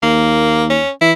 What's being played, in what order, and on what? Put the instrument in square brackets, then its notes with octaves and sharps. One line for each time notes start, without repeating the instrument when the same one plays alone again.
[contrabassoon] D#2 [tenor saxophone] A#3
[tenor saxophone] C#4
[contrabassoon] E3 [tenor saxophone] E4